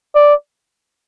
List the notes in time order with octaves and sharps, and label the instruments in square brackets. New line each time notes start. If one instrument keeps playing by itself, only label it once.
[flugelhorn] D5